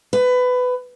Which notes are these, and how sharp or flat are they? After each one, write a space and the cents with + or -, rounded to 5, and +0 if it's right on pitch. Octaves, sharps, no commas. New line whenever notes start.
B4 +20